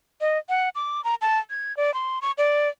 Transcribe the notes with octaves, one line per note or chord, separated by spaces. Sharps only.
D#5
F#5
D6
A#5
A5
G#6
D5
C6
C#6
D5